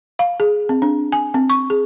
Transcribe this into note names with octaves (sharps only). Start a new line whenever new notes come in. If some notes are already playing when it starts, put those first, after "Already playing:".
F5
G#4
C4
D4
G#5
C4
C#6
G#4